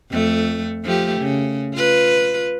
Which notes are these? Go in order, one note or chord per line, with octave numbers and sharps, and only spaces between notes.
F2 A3
F3 A3 G4
C#3
F4 B4